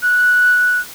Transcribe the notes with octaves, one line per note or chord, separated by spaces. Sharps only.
F#6